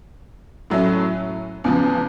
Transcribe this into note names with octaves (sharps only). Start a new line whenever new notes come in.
A2 F#3 A3 C#4 E4
E2 C#3 F3